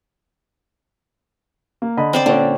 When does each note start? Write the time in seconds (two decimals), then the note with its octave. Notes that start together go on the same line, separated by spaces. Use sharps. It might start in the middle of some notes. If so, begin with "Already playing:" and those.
1.82 A#3
1.97 D3 D#5 B5
2.13 C4 C5 D5
2.26 A#2 D3 C#4